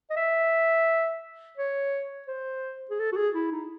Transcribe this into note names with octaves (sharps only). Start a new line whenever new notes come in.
D#5
E5
C#5
C5
G#4
A4
F#4
G#4
E4
D#4